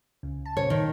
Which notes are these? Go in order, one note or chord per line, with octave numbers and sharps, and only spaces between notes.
C#2 C#3
A5
A#2 C#3 C5 C#5
A2 D#3